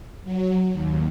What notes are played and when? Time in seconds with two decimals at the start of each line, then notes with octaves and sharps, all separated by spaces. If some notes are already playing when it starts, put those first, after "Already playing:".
0.24 F#3
0.72 D#2